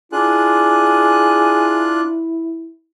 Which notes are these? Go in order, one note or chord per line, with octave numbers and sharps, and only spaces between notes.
D4 E4 F4 G#4 F#6